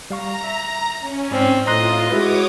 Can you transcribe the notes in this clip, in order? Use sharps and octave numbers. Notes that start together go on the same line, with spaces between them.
G3 F5 A#5 C#6
E5
C#4
G#2 C4 D5
A2 F4 D#5 A#5 C6 F#6
G#3 E4 F#4 B4 C#5 E5 D6 D#6